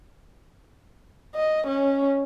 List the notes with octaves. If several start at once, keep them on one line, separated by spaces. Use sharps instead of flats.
D#5
C#4